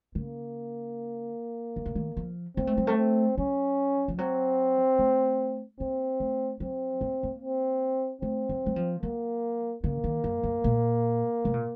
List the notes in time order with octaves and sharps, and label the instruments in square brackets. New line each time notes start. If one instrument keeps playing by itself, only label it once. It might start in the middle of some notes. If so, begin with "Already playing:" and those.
[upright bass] C#3 [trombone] A#3
[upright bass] D#3
C#3
D#3
F3
[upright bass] A#3 [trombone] C4
[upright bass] A3
F#3
A3
[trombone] C4
[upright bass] F#3 [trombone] C#4
[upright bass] F3
[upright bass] F#3 [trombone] C4
[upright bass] A3
[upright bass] A#3 [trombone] C4
[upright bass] A3
[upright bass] F#3 [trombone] C4
[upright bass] A#3
A#3
[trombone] C4
[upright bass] A3 [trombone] C4
[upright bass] F#3
F#3
F3
[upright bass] F#3 [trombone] A#3
[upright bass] C#3 [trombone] A#3
[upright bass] D#3
F#2
F#2
A#2
C3
A#2